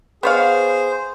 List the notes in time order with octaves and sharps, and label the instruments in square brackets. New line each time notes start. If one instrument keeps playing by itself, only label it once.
[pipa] B3 C#5 F5 [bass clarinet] G#4 [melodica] C5